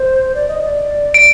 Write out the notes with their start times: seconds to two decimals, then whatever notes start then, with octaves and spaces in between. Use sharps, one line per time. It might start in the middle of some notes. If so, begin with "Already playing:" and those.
Already playing: C5
0.35 D5
0.48 D#5
0.62 D5
1.14 D7